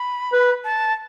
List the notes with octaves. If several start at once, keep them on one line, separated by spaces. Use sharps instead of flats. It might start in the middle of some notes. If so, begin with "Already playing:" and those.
Already playing: B5
B4
A5